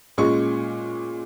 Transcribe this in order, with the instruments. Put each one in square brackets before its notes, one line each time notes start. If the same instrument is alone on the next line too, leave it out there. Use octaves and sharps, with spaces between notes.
[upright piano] A#2 G#3 C#4 C#6